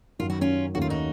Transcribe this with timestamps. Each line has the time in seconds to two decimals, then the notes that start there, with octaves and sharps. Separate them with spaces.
0.19 F#2 D#3 F#3 F4
0.30 F#4
0.41 C#4 F4
0.74 D#2 D#3 A3 C#4 F#4
0.82 F4
0.90 D#4 F#4